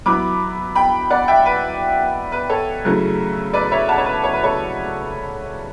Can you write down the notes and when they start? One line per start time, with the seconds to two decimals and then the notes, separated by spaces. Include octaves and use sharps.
0.06 F#3 B3 E4 B5 D6
0.75 G5 B5
1.10 D5 F#5
1.28 E5 G5
1.46 B4
2.32 B4
2.49 A4 C#5
2.85 C#3 F#3 A3 E4
3.53 B4 D5
3.71 C#5 E5
3.88 F#5 A5
3.98 C#5
4.06 B4
4.24 C#5
4.33 B4
4.43 A4 C#5